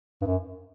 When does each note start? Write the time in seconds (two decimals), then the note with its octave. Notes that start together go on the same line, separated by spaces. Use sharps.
0.22 G2
0.26 F#2